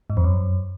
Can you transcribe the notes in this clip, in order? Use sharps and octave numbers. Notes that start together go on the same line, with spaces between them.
G#2
F2
F#2